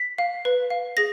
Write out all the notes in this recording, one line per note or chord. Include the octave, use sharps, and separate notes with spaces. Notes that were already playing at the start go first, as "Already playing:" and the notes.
Already playing: B6
F5
B4
F5
G#4 A#6